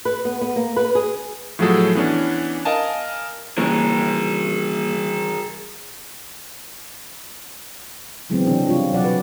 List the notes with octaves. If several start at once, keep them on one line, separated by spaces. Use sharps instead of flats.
B4
B3
B3
A#3
B4
G#4
A2 F3 F#3 F#4 G#4 A4
E3 B3 C#4 D4
A#4 D#5 F5 G#5 A5
G2 C#3 E3 A#3 G4 G#4 A#4 C#7
C#3 E3 F#3 G#3 B3 C4
C3 C#4 D4
G3 D4 F4 C#5
B2 F#3 D5 F#5
B4